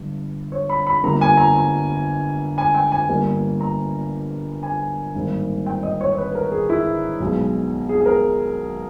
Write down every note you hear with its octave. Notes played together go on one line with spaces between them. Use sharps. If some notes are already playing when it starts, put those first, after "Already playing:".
Already playing: G1 G2
C#5
B5
B5
G1 G2 G3 A#3 A#5
G#5
A#5
A#5
G#5
G5
G#5
G1 G2 G3 A#3
A#5
G#5
G#1 G2 D#3 A#3
G5
D#5
C#5
C#5
B4
A#4
G#4
E4
B1 B2 G#3
G#4
G#4
A#4